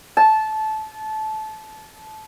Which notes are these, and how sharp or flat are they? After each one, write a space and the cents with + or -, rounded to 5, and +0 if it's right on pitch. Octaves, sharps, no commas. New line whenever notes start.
A5 -20